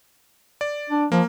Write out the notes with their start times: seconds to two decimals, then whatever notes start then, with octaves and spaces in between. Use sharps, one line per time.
0.61 D5
0.90 D4
1.12 F3 A#3